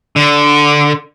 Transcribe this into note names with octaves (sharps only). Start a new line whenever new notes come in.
D3